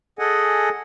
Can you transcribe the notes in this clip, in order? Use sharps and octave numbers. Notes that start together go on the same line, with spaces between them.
G#4 A4 D#5 F#5 G#5